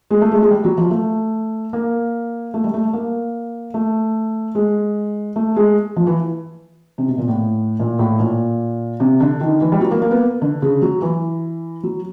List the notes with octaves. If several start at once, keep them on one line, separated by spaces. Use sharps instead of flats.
G#3
A3
G#3
G#3
G3
F#3
F3
A3
A#3
A3
G3
A3
A#3
A3
G#3
A3
G#3
F3
E3
C3
B2
A#2
A2
A#2
A2
A#2
C3
D3
D#3
E3
G3
F#3
A#3
A#3
B3
D3
C#3
F#3
E3
F#3